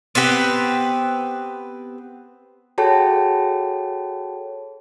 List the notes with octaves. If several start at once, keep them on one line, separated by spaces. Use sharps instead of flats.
B3 C4 G4 B4
F#4 G#4 A4 C#5 G5 A5